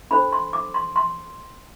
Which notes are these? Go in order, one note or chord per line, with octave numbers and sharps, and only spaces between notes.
D4 A4 C5 B5
C6
D6
C6
C6